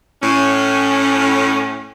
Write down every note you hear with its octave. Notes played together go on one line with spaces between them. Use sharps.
A2 C#4